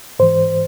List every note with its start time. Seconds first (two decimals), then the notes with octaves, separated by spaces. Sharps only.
0.19 G#2 E3 C5